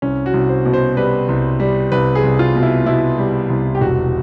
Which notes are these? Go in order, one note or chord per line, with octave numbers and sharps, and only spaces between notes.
C2 C#4
F#4
C2
C5
B2
C5
G3 B4
C2
G3
C2 B4
G#4
C2
F4
B2
E4
B2 E4
G3
C2
G4
E1 F#4